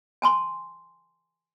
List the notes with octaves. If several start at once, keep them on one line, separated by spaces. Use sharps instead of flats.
G#5 A5 C6